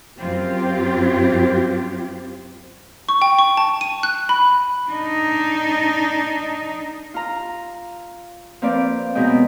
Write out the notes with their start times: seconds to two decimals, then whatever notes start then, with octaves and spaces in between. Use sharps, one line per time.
0.18 F#2 C4 F4 G4
3.09 C#6
3.22 G5
3.39 C#6
3.57 A5
3.81 D#7
4.03 F#6
4.29 B5
4.89 D4 D#4
7.14 F4 A#5
8.62 F3 A#3 C4 B4 D5
9.15 B2 F#3 G#3 C4 D#5 G5